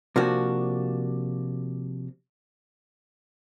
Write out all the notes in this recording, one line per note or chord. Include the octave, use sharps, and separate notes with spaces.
C3 F3 A#3 D4 F#4